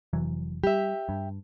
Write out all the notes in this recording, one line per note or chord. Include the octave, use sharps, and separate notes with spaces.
F1 E3 F#3
G3 G4 E5
G2